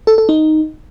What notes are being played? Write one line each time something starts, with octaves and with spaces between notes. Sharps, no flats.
A4
A4
D#4